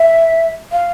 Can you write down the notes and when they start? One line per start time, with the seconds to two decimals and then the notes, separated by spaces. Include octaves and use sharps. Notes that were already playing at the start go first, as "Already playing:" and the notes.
Already playing: E5
0.72 F5